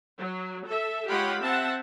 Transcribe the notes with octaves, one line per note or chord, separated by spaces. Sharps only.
F#3
A4 E5
G#3 F4 G4 C#5 F#5 B5
C4 E5 F#5 A5